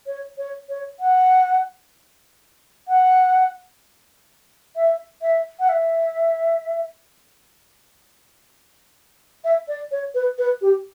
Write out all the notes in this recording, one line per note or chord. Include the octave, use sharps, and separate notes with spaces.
C#5
C#5
C#5
F#5
F#5
E5
E5
F#5
E5
E5
D5
C#5
B4
B4
G4